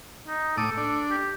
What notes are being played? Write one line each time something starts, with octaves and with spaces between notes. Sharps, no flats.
D#4
A2 A4 D6 D#6
D4
G4